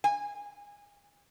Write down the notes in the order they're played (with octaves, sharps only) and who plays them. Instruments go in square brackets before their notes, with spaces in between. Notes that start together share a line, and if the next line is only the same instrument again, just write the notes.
[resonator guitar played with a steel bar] G#5